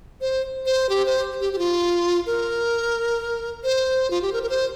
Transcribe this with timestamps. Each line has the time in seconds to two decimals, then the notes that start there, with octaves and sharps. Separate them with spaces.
0.21 C5
0.66 C5
0.89 G4
1.06 C5
1.41 G4
1.53 G4
1.58 F4
2.26 A#4
3.64 C5
4.10 F4
4.22 G4
4.33 A#4
4.43 A#4
4.49 C5